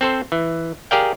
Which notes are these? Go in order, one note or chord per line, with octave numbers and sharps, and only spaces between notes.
C4 A4 C5
E3
G4 G#4 A#4 D5 F5 G5